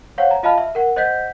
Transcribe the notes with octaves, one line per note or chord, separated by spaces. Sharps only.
C5 C#5 F5 F#5
A#5
F4 D#5 F5 A5 B5 F6
E5
A#4 F#5
C5 D#5 F#5 G6 B6